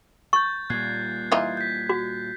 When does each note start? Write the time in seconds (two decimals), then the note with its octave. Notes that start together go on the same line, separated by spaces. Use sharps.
0.33 C#6 G6 A6
0.70 A#2 G3 F#6 G#6 C7
1.32 E3 D#4 F4
1.57 G6 B6
1.89 F#4